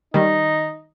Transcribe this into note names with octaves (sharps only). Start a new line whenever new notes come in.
D#3 G3 D#4